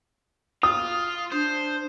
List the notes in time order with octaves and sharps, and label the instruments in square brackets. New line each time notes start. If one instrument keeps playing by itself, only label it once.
[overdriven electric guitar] F4 [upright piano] D#6
[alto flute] D4 [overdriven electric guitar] C5